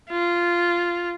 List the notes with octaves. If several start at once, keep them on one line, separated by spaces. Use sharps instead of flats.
F4